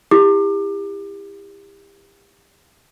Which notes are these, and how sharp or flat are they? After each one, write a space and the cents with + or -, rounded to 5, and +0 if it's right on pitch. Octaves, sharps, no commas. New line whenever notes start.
E4 +0 G4 +30 D6 +30